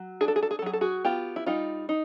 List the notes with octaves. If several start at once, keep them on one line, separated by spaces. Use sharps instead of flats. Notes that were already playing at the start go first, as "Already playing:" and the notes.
Already playing: F#3
D4 G#4
A4
G#4
A4
G#4
A4
F#3 G#4
A4
F#4 G#4
B3 F4 G4
E4
G3 D#4 F4
D#4